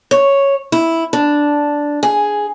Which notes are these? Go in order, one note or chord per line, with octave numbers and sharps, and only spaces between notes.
C#5
E4
D4
G#4